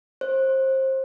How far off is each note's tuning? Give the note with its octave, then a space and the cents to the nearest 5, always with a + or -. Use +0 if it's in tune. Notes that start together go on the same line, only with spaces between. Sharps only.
C5 +25